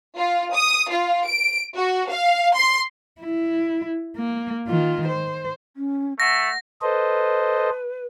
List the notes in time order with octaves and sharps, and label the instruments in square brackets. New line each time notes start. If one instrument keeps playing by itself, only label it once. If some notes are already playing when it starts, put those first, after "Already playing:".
[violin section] F4
D#6
F4
D7
F#4
F5
C6
[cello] E4
A#3
D#3 F4
C5
[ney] C#4
[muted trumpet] A3 [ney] F#5 [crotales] A#6
[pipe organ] A4 C5 D#5 [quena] B4